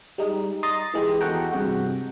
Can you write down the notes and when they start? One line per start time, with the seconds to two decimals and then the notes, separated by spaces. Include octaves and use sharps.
0.18 G3 G#3 D#4
0.63 D#5 A#5 C6 D#6 A6
0.94 E3 G#3 G4
1.20 E2 F#4 A4 F#5 G5 A#5
1.52 G2 C3 G#3 F#4